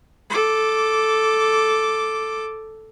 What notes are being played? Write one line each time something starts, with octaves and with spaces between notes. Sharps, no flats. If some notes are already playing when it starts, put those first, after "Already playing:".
A4 D6